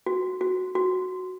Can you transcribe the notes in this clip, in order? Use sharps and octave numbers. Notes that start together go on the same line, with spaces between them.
F#4
F#4
F#4